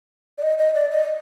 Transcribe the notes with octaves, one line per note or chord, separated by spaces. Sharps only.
D5
D#5
D#5
D5
D#5